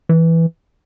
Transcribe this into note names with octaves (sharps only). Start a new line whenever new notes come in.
E3